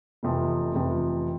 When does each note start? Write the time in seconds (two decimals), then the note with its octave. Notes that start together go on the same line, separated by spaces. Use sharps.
0.23 F1 F2 C3 E3
0.74 F1 F2 C3 E3